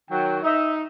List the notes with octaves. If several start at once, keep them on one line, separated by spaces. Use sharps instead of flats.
D#3 F#3 G5
D#4 E5